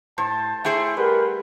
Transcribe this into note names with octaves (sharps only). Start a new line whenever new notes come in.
A2 C5 A5
A3 E4 G#4 C5 G5 C#6
G3 A#4 B4 F#5 B5